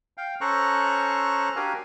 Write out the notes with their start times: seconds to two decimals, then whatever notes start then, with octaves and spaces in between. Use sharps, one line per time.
0.17 F5 G5
0.41 C#4 A4 C5 A#5 C#6 F#6
1.56 D4 F#4 G4 A#4 F5 G#5